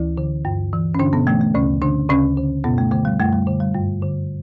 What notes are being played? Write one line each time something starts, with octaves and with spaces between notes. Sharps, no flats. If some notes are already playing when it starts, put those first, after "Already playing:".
Already playing: D2 E3 E4
D3
G2
E3
C#4
G2 D3 D4
B2 B3
E3 A3
A3
D2 C#3 C#4
D3 D4
D2 C#3 C#4
D3
F#2 B2 B3
A3
D3 A3
G3
F#2 A3
G3
D3
G3
G2
D3